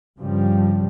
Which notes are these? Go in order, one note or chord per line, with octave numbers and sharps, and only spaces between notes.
G2 C#3 F3 G3